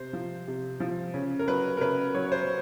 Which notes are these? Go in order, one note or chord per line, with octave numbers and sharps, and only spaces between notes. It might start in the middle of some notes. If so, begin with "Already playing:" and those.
Already playing: C3 C5
F3
C3
F3
C#3
A#4
F#3 B4
A#4
C#3 B4
F#3 C#5
C5